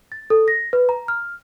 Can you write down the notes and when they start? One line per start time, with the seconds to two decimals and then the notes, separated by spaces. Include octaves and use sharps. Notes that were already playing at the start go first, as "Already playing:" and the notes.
0.12 A6
0.30 A4
0.48 A#6
0.73 B4
0.89 A#5
1.08 F6